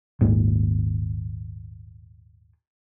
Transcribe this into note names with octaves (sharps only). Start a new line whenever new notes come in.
D#1 G#1 A#2